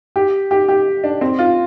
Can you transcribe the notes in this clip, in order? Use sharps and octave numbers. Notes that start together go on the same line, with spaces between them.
G4
G4
G4
D4
C4
F4